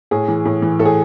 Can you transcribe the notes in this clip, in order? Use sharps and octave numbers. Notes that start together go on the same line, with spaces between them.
A2 G#4
E3
A2
E3
A2 A4
G#4